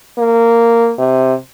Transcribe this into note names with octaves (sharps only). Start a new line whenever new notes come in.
A#3
C3